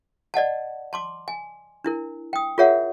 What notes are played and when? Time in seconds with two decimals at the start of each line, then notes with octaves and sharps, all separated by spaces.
0.34 D5 D#5 F#5 A5
0.93 A5 C6 D6
1.28 G#5
1.85 D4 E4 A#4
2.33 G5 D#6
2.58 F4 G#4 A#4 C#5 E5 F#5